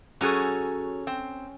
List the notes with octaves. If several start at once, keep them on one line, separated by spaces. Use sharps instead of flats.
F#3 C#4 F#4 G#4 A4
C4